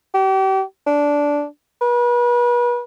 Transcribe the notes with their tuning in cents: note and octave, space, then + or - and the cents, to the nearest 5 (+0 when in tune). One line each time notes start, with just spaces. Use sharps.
G4 -35
D4 -10
B4 -35